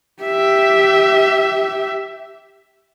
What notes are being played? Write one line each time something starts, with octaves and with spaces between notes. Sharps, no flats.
G4 E5